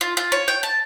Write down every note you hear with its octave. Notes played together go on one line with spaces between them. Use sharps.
F4
F4
C#5
G5
A5